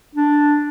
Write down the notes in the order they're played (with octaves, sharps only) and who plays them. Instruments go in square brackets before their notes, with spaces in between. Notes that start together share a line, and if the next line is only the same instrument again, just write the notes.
[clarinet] D4